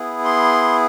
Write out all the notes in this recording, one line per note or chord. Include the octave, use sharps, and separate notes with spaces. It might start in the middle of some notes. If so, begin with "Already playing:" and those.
Already playing: B3 E4 G#4
C6